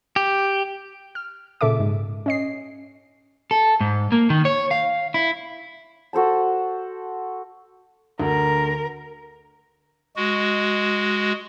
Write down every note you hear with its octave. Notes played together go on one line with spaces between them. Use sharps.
G4
F6
A#2 C#3 A4 E5 D6
G#2
C#4 D#5 C7
A4
G#2
A#3
D#3
C#5
F5
E4
F#4 A4 C5 A5
D2 A#4
G#3 F#4